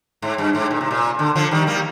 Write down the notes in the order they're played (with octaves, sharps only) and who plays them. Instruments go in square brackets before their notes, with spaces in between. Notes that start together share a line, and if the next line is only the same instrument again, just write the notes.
[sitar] G#2
G2
G#2
A#2
C3
A#2
D3
D3 F3
D#3 G3
G3 A#3